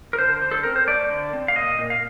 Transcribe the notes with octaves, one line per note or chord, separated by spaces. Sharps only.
A#4
D3 C5
D3
A4
C4 A#4
C5
A3 D5
D3
C4
F5
A#2 D#5
A#2
F5